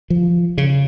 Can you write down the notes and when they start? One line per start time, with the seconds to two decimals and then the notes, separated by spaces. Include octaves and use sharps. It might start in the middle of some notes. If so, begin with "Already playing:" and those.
0.10 F3
0.58 C#3